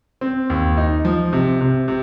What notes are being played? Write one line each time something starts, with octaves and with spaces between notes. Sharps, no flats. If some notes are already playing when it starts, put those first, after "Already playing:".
C4
D#2
D#4
F3
C3
C3
C3